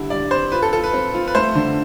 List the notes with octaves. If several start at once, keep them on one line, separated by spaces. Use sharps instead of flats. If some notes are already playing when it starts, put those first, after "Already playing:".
Already playing: D3 G3 E4
G3 D5
C4 C5
F4 B4
A4
F4 A4
B4
C4
F4
B4
A3 C5
D3